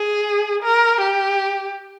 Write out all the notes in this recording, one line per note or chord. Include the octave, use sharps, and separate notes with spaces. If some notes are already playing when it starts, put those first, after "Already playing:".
Already playing: G#4
A#4
G4